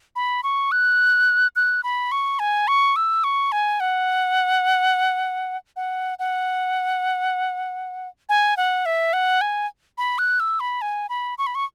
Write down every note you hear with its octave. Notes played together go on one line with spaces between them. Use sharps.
B5
C#6
F#6
F#6
B5
C#6
G#5
C#6
E6
C#6
G#5
F#5
F#5
F#5
G#5
F#5
E5
F#5
G#5
B5
F#6
E6
B5
G#5
B5
C#6
B5
C#6